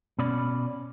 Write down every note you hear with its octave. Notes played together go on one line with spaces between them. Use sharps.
B2 C#4 D5 B5